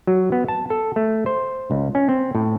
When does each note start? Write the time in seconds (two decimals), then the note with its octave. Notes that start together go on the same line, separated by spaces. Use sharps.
0.07 F#3
0.32 B3
0.48 A5
0.70 A4
0.96 A3
1.26 C5
1.71 C#2
1.95 C#4
2.09 C4
2.35 A2